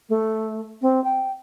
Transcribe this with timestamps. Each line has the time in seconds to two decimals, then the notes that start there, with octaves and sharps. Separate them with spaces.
0.09 A3
0.82 C4
1.04 G5